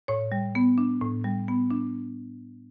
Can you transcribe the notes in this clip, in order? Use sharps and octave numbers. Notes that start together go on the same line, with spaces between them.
A2 C#5
G3
B3
D4
A2
G3
B3
D4